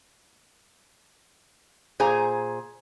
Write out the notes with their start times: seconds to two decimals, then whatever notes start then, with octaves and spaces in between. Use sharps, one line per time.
2.00 A#2 G#4 C5 G#5 A#5